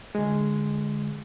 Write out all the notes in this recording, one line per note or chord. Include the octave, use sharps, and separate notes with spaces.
D3 G#3